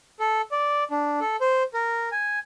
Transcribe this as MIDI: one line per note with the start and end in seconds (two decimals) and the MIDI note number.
0.20 0.41 69
0.52 0.84 74
0.91 1.20 62
1.20 1.36 69
1.41 1.63 72
1.74 2.09 70
2.12 2.39 80